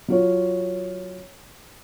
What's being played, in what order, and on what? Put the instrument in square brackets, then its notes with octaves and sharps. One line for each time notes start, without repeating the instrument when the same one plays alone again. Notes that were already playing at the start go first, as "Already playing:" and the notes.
[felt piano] F#3 F4 C#5